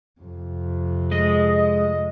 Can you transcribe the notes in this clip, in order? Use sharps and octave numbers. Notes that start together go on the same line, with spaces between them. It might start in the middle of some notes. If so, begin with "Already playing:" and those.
F2 C3
G#3 D#5